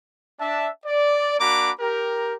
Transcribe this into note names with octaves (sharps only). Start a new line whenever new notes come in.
D4 E5 A5
D5
A#3 D4 F#4 A#5 B5 D6
G4 A#4